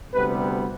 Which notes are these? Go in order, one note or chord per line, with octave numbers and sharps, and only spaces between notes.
D2 C3 G3 B3 B4